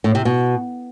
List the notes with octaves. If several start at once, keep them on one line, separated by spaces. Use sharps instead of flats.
A2
C3
B2